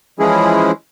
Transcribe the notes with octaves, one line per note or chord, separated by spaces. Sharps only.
E3 F3 G#3 C#4 E4 G#4